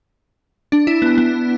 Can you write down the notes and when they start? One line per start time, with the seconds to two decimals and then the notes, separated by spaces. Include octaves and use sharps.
0.72 D4
0.87 E4
1.02 B3
1.18 B3